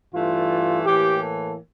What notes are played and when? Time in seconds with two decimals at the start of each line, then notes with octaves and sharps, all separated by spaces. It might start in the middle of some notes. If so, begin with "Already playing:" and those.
0.13 G2 E3 A3 F4
0.85 A2 E3 A#3 G4
1.21 A4